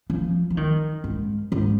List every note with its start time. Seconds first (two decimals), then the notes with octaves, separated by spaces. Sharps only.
0.10 F3
0.50 F3
0.57 D#3
1.04 G#2
1.52 G#2